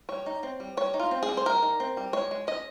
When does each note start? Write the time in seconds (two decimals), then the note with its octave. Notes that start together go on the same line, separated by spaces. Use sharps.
0.09 G3 C#5
0.26 D#4
0.43 C4
0.60 G3
0.77 G3 C#5
0.94 D#4
1.00 F4
1.11 C4
1.23 G#4
1.28 G3
1.37 C5
1.46 G3 A#4
1.62 D#4
1.80 C4
1.97 G3
2.13 G#3 C#5
2.31 G#3
2.47 C#4 D#5